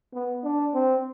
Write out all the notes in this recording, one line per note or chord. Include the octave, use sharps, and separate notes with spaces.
B3
D4
C4